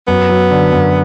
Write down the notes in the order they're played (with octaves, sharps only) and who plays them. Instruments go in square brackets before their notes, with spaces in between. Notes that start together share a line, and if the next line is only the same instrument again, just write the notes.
[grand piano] F#2 [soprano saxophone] B3
[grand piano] F#3
D3
F#2